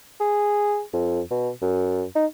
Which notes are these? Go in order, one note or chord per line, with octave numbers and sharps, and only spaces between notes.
G#4
F2
B2
F#2
D#4